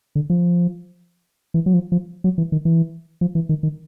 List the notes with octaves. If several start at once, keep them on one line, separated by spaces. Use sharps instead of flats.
D3
F3
E3
F#3
F3
F3
F#3
E3
D#3
E3
F3
E3
D#3
D#3